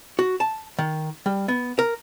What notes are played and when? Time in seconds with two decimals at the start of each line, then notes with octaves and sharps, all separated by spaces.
0.19 F#4
0.40 A5
0.79 D#3
1.26 G3
1.48 B3
1.79 A#4